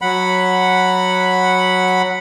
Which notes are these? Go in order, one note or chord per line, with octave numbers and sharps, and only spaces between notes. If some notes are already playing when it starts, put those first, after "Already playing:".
F#3 F#5 B5